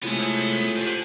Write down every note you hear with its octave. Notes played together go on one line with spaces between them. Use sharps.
A2 C3 G#3 B3 F4 A4 G#5
D3 G4 C5